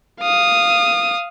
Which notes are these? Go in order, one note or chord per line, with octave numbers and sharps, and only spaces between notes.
F5 D#6